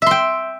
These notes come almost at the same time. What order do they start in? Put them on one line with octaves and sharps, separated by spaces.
E5 C6 G5